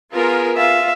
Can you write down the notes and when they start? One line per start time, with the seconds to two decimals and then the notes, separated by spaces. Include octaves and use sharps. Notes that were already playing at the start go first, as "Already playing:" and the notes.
0.13 B3 F4 G#4 A#4
0.57 F4 E5 F5